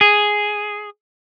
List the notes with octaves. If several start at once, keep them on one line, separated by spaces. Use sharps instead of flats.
G#4